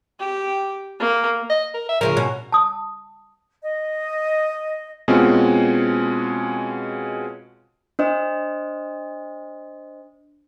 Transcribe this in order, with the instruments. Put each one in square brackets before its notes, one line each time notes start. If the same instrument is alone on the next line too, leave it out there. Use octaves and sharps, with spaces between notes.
[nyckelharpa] G4
A#3
[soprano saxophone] D#5
A#4
E5
[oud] D2 C#3 F3 [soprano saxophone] A#4
[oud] B2 C#4 F#4
[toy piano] A5 D#6
[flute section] D#5
[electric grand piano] B2 G#3 C4 C#4 F4 F#4
[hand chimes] D4 C5 D#5